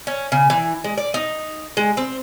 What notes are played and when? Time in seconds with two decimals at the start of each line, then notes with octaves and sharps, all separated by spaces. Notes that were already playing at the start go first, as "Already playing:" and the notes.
0.07 C#4
0.32 C#3
0.50 E3
0.84 G#3
0.98 D5
1.14 D#4
1.77 G#3
1.97 C4